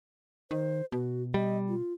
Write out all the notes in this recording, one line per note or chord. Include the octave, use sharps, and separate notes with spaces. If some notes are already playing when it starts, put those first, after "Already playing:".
D#3 C5
B2 F#4
G3 D#5
F4